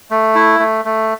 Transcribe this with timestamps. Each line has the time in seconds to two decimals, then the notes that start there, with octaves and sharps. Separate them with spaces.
0.11 A3
0.35 E4
0.60 A3
0.85 A3